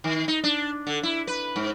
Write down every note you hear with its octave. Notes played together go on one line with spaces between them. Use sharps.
D#3
D#4
D4
D3
E4
B4
G#2